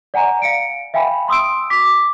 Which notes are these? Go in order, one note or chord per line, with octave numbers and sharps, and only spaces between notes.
D5 F#5 G#5 A#5
F5 C#7 D7
E5 F5 G5 G#5 B5
C6 D#6 E6 D7
D6 B6